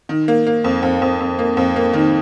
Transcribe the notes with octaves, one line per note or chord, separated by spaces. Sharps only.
D#3
A#3
A#3
F2
F2
F2
F2
A#3
F2
A#3
D#3